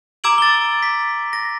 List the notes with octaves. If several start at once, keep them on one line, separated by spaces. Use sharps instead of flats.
A#5 D6 E6 G#6 D7 F#7
A6 G7
B6
A#6